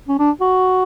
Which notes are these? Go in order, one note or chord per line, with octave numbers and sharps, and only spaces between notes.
C#4
D4
F#4